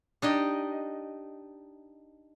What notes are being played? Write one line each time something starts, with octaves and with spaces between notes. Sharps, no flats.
D4 D#4 G4 D#5